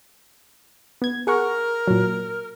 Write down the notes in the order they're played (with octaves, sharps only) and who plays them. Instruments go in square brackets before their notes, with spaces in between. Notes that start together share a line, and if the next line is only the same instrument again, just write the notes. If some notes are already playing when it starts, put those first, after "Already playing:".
[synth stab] B3 G#6
[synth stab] G#4 F#5 C#6 [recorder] A#4
[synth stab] A#2 F#3